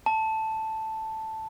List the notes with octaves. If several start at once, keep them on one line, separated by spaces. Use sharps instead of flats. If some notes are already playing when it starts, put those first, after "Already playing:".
A5